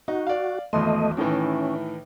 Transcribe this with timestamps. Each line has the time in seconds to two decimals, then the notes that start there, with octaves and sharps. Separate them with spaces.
0.08 D#4 F#4
0.27 D5 F5
0.73 G#1 E2 A3 D#5 C6
1.17 A2 D#3 E3 C#4